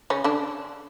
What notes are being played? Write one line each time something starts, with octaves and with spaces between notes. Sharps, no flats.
C#3 C#4
D3 D4